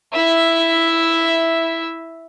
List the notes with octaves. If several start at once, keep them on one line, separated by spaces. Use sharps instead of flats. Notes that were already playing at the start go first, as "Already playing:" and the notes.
E4 E5